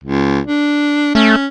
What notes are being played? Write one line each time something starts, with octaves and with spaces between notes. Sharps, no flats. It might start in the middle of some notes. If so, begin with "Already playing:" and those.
C#2
D4
A3 C#4